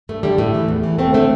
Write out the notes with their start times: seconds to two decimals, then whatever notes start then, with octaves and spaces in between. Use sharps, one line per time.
0.09 G2 A3
0.23 D3 G3
0.38 A2 A3
0.54 E3
0.68 E2
0.83 E3
0.99 E2 A3 C4
1.14 D3 A3 C4